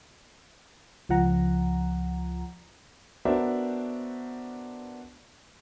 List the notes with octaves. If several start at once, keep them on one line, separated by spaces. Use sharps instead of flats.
C#2 F3 F#5 A#5
B3 D4 F#4 A#4 C5 E5